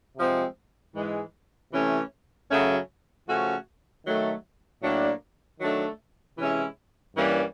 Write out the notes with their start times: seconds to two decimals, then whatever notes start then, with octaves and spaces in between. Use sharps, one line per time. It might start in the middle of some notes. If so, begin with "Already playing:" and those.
0.16 C3 F3 G#3 C4
0.94 G#2 E3 G#3
1.72 C3 E3 A3 C#4
2.50 F#2 C#3 F#3 A3 C#4
3.27 C#3 F3 A3 C#4 F#4
4.06 D#3 F#3 A3
4.82 A2 F#3 A#3 D4
5.60 D#3 F#3 A3 D4
6.38 C3 E3 G#3 C#4 E4
7.15 G2 E3 G3 A#3 C#4